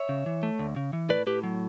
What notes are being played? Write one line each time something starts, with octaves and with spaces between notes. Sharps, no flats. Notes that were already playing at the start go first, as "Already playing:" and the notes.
Already playing: C#5 E5
C#3
E3
A3
D2
C#3
E3
A2 B4 D5
A2 G4 B4
F#3